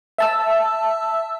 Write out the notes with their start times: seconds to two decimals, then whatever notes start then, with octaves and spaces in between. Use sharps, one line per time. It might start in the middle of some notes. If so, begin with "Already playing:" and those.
0.18 E5 A5 E6